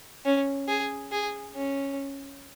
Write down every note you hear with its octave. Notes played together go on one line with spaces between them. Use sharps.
C#4
G#4
G#4
C#4